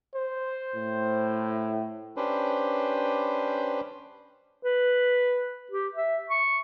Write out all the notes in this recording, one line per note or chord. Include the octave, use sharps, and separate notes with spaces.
C5
A2
C#4 D4 G4 B4 C5
B4
G4
E5
C#6